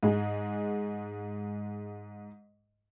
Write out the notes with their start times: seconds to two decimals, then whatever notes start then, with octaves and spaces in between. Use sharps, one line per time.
0.03 G#2 G#3